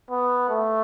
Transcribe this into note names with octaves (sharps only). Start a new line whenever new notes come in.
B3
A3